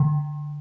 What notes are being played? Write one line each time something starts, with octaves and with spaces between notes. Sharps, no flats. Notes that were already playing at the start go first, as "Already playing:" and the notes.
Already playing: D3